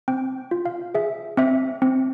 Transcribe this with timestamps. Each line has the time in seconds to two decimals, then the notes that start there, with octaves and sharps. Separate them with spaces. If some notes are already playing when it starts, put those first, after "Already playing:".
0.08 C4 G5
0.51 F4
0.66 F5
0.95 G#4 E5
1.37 C4 E5
1.82 C4